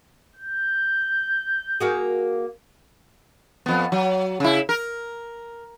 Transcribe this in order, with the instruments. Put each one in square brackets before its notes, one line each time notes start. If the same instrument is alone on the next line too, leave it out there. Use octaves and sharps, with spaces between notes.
[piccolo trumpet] G6
[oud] A#3 F#4 G#4
[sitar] F2 B3
F#3
C#3 E4
A#4